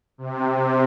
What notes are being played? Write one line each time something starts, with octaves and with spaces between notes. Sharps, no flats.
C3
C3